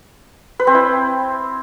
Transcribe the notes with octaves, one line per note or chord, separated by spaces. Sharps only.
B4
C4
E4